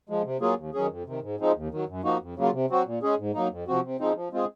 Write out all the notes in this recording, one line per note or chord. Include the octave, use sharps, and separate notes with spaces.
F3 G#3
C3
F#3 A#3 F4 G#4
D#2
D#3 F#3 C#4 G#4
F2
C3 D#3
G#2
F3 G#3 C4 D#4
D#2
D#3 F#3
F#2
F3 A#3 D#4 F#4
F2
C#3 F#3 A#3 F4
C3
F#3 C4 F#4
A#2
G#3 C#4 G#4
G#2
F#3 A#3 D#4
F2
C3 F3 C4 F#4
C3
F3 G#3 C4 D#4
F3
G#3 C4 F4 G#4